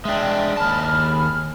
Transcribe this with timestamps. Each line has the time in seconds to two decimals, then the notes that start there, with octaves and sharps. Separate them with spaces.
0.05 G#3 D4 E5 G5
0.57 D#2 G#4 A5 B5 F6